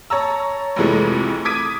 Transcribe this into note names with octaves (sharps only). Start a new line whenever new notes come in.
C#5 A5 A#5 E6
A1 F2 C3 E3 G#3 A3
D6 D#6 G#6 B6 D7 D#7